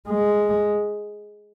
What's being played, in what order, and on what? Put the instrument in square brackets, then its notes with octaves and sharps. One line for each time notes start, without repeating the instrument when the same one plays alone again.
[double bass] G#3